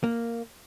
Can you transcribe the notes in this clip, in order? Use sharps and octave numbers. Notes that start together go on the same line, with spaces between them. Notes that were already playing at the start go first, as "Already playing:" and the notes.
A#3